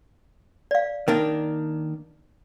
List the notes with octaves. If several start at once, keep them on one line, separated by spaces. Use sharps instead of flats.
D5 F5
D#3 A#3 D4